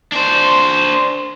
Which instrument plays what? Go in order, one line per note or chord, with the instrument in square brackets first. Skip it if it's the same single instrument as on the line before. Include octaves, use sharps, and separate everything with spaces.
[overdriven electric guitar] D4 C5